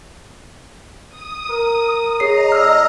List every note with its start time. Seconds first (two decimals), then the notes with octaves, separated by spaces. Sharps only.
1.09 D#6
1.50 A#4
2.20 G#4 C#5 D#5 A#5 C7
2.52 A2 D5 E6 F6